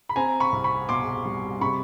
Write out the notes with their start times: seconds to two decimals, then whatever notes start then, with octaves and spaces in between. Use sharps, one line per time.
0.09 B5
0.16 C4 G#5 A#5
0.40 B5 C#6
0.52 C2
0.64 B5 C#6
0.89 B2 C6 D6
1.25 G3
1.61 C3 B5 C#6